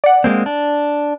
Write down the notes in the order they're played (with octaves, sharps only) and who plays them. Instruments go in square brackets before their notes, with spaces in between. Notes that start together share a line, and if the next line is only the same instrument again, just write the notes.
[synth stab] D5 F#5
[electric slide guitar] G#3 A#3 C4
D4